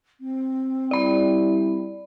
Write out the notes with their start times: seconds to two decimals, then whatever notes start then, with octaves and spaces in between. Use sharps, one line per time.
0.20 C4
0.91 G3 E4 D5 B5